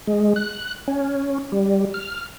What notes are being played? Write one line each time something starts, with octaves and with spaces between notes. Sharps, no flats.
G#3
F#6
C#4
G3
F6